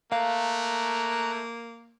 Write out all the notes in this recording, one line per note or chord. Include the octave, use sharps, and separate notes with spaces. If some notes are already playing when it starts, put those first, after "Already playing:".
A3 A#3 F5 A#5 F#6